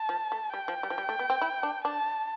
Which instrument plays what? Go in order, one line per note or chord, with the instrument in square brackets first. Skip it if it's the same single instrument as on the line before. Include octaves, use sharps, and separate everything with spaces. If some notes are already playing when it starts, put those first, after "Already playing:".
Already playing: [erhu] A5
[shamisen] F3
A3
[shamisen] G3 [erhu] G5
[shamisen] F3
G3
F3
G3
A3
B3
C4
E4
D4
[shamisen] D4 [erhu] A5